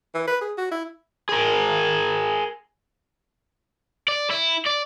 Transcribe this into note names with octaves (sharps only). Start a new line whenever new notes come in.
E3
B4
G#4
F#4
E4
G#4 A#4
D5
E4
D5